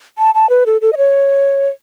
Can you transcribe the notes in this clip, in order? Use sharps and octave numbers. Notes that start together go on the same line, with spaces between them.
A5
A5
B4
A4
A4
D#5
C#5